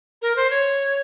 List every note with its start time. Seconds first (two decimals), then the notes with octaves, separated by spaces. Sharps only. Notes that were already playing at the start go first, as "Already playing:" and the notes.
0.22 A#4
0.36 C5
0.50 C#5